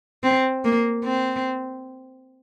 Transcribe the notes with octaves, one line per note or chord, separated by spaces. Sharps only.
C4
A#3
C4